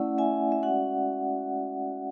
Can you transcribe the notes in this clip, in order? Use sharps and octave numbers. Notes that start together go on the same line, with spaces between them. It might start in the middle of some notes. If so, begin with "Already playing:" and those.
Already playing: A3 C#4 E4 D5 F#5
E5 G#5
E5
G#3 C#4 F#4 D5 F#5